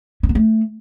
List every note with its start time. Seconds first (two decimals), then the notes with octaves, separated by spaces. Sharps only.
0.23 C#4
0.29 B3
0.35 A3